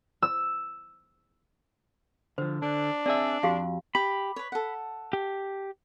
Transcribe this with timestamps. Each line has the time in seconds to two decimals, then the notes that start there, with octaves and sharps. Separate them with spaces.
0.22 E6
2.38 D3 F3 C5
2.62 D3 D4
3.06 C4 G#4 D5 E5
3.43 F2 F#4 G4 F5
3.95 G4 B5
4.36 B4 C#5
4.52 A4 F#5
5.13 G4